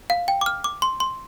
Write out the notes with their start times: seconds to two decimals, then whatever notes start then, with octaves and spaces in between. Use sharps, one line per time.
0.10 F5
0.28 G5
0.41 D6
0.46 F6
0.64 D6
0.82 C6
1.00 C6